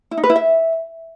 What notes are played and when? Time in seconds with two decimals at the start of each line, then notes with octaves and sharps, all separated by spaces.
0.11 E4
0.17 D#4
0.24 B4
0.30 E4
0.36 E5